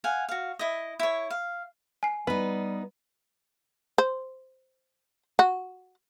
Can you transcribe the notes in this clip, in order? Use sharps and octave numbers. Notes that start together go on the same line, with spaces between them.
F5 F#5 G#5
F#4 F5
E4 D#5
E4 C#5
F5
G#5 C7
G3 B3 D#4 B4
C5
F#4